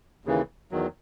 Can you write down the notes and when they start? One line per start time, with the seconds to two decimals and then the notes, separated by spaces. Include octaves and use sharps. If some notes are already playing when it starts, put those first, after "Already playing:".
0.25 D#2 C#3 E3
0.71 E2 D#3 F#3